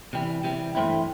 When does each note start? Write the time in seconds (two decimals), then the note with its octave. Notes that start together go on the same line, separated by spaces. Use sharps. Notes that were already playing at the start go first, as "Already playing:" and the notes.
0.13 C3 E3 G3
0.44 C3 E3 G3
0.75 G2 E3 A3 C4 E4